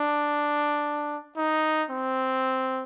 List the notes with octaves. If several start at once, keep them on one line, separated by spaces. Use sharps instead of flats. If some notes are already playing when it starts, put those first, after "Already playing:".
Already playing: D4
D#4
C4